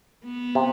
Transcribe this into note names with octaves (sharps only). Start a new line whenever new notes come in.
B3
C3